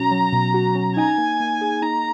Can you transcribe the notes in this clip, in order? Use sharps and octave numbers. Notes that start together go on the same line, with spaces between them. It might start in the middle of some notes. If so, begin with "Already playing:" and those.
Already playing: B2 F#3 C#4 F#4 A#5
F#3
B2
F#4
C#4
D#4 G#5
A#3
A#3
G#4
D#4 A#5